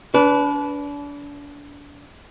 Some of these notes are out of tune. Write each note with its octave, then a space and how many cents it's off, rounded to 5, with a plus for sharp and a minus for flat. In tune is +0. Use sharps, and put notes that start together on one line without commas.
D4 -35 B4 +0